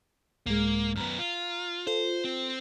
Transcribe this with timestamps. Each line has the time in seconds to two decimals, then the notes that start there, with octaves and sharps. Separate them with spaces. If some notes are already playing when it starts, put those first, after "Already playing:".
0.46 C2 G#2 G#3 A#3
0.96 F#2 B3 A#5 F6
1.19 F4
1.87 F4 A4 C5
2.24 C4